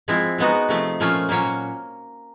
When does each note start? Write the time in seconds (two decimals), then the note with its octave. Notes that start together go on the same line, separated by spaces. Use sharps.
0.08 F3 G#3 C4 E4
0.38 G#3 B3 D#4 F#4
0.69 C3 F3 A3
1.00 A#2 F3 A3 C#4 F4
1.29 A#2 F#3 A#3 C#4